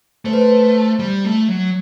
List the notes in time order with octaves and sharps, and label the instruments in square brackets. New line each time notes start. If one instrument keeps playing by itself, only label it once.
[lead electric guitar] A3 [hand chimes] C5
[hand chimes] B4
C5
[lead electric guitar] G3
A3
F#3